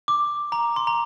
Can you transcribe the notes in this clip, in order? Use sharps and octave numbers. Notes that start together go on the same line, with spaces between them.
D6
A#5
C6
A#5